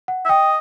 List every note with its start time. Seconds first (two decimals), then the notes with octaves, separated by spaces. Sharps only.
0.08 F#5
0.25 E5
0.29 D#5 G5